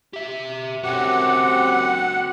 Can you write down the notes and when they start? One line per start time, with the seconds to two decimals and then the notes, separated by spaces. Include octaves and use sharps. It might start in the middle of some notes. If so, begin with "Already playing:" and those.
0.14 G4 E5
0.83 F#2 C4 F#4 G4 A4 F#5